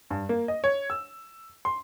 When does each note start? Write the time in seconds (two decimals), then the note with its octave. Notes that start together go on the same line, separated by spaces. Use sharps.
0.11 G2
0.29 A#3
0.48 D#5
0.64 C#5
0.90 E6
1.65 C6